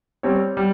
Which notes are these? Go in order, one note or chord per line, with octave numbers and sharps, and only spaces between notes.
G3 C4 G4 C#5
G3